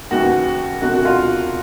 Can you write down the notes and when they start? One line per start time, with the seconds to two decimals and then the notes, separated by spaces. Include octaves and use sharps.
0.11 D#2 C#3 E3 F#4
0.81 E1 D2 C3 F#4
0.93 F#4
1.05 F4